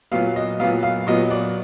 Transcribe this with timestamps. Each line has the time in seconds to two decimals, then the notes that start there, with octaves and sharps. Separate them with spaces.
0.12 A#2 F#3 B3 F5
0.36 D#5
0.59 A#2 F#3 B3 F5
0.83 F5
1.07 A#2 F#3 B3 D#5
1.31 D5